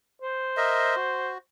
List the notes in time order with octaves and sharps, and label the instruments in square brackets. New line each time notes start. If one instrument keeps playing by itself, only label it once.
[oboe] C5
[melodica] A#4 D#5 E5
F#4